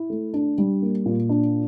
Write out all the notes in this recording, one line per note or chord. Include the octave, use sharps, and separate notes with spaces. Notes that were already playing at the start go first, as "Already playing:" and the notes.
Already playing: E4
A3
D4
G3
A#3
A#2
D4